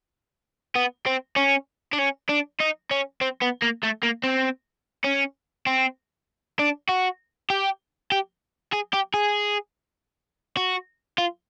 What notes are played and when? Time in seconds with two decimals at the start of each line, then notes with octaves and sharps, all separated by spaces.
0.75 B3
1.06 C4
1.36 C#4
1.93 D4
1.99 C#4
2.29 D4
2.60 D#4
2.91 C#4
3.21 C4
3.42 B3
3.62 A#3
3.83 A3
4.03 A#3
4.23 C4
5.04 C#4
5.66 C4
6.59 D4
6.89 F#4
7.50 G4
8.12 G4
8.73 G#4
8.94 G4
9.14 G#4
10.57 F#4
11.18 F4